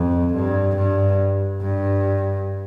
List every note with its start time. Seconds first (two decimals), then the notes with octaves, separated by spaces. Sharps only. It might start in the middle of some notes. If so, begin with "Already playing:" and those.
Already playing: F2
0.34 G2
0.76 G2
1.61 G2